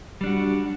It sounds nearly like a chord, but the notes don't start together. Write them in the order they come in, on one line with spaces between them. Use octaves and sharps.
G3 D4 F#4